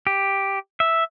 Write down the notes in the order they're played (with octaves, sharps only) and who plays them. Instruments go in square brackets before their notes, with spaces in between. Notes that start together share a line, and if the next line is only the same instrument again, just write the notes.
[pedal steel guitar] G4
E5